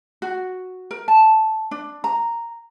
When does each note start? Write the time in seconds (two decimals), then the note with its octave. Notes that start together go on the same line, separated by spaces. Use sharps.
0.22 F#4
0.91 A#4
1.08 A5
1.71 D4
2.04 A#5